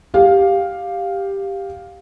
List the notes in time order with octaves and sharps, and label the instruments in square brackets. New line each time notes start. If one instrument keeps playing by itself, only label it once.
[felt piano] G4 F5